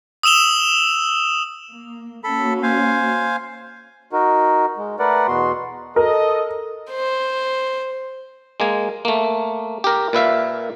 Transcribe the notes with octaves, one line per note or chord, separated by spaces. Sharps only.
D#6 E6 E7 F7 G7
A#3
A#3 C#4 F#4 A4 B5
C5 F5 G#5
D#4 F#4 A#4
G#3
A3 A#4 B4 D5 F#5
E2 B2 B3 F#4 C6
A4 A#4 D#5
C5
G#3 A#3 G#5
A3 A#3
G4 A#4
A#2 B4 E5 F5